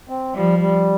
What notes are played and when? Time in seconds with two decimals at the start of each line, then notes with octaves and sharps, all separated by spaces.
0.09 C4
0.35 F3 G3
0.59 G3